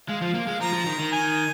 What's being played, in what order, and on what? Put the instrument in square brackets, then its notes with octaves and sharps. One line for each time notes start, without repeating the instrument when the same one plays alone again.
[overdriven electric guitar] G#3 [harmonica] F5
[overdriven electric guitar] F3
A#3
G#3
[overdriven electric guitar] F3 [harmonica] A#5
[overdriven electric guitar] F3
D#3
D#3
[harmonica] G#5